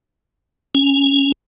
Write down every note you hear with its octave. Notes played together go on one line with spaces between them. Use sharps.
C#4